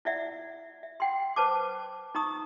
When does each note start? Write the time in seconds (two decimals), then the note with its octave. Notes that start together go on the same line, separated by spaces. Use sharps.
0.05 E4 D5 E5 F#5
0.83 E5
1.00 F#5 G5 C6
1.36 B4 C5 A5 D6
2.15 D#4 A#5 C#6 D#6